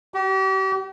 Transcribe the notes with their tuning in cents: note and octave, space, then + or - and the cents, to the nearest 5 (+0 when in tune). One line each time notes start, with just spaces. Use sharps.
G4 -40